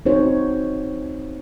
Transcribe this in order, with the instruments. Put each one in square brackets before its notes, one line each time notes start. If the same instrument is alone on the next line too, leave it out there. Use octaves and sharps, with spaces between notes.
[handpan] C4 D#4 F#4 C5 C#5